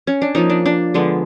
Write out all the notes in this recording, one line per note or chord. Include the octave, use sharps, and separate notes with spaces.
C#4
D4
F3 A#3 C#4 D#4
D4
D4
D3 F3 G#3 B3